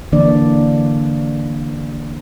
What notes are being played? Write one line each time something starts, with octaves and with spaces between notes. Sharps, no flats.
D3 E3 A#3 D4 D5